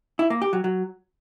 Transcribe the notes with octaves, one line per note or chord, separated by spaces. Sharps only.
E4
A#3
G4
F#3
F#3